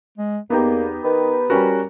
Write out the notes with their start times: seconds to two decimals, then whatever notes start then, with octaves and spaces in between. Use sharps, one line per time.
0.18 G#3
0.50 E2 A#3 B3 D#4 G4
1.04 D#3 B4
1.50 G3 C#4 F#4 A#4